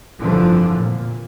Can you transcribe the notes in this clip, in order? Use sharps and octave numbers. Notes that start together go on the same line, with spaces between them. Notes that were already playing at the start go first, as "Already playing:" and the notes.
F1 G2 D3 E3 F3
A#2